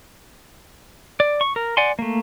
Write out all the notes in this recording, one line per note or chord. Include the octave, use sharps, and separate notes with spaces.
D5
C#6
A#4
D5 F#5 G#5 C6
A3 A#3